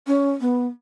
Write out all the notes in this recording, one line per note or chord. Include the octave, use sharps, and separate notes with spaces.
C#4
B3